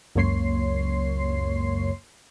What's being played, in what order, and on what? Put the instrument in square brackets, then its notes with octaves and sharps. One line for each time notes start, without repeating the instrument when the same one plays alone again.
[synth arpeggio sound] C#2 F#2 A#3 C#5 C6 C7